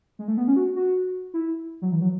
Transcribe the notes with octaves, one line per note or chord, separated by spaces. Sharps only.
G#3
A3
B3
C#4
F#4
F#4
E4
F#3
E3
F#3